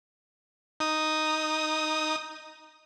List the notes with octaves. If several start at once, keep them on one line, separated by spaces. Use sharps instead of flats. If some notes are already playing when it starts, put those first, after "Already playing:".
D#4 D#6